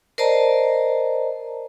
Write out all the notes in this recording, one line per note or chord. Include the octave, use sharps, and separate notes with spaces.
A#4 C5 D5 D#5 A5 A#5